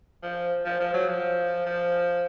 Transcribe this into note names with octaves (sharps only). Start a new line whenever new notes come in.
F3
F3
F3
F#3
F3
F3